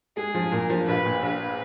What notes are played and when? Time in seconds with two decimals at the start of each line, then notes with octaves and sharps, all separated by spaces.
0.17 G#3 G#4
0.34 F3
0.52 A#2 A#4
0.70 F3
0.87 A#1 B4
1.05 A#2
1.23 A#1 B4